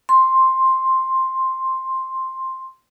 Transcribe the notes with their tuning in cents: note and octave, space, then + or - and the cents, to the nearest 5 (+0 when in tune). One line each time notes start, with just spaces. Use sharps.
C6 +5